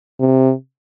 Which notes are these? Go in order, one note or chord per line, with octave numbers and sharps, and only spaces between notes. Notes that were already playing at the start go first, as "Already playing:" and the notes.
C3